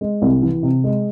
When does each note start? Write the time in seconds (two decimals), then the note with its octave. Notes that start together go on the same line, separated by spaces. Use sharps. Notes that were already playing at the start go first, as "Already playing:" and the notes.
0.01 G#3
0.22 C2
0.43 E3
0.63 C3
0.84 G#3